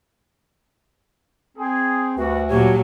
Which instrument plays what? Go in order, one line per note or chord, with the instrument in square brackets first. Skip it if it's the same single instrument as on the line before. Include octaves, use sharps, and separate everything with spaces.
[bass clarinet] C4 [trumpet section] G#4
[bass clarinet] D2 [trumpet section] G3 F#4 [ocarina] B4
[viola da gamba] A#2 F#3 [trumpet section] G3 D4 C#5 [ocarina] G4